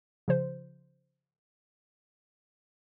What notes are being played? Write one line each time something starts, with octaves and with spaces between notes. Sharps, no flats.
C#3 F3 C5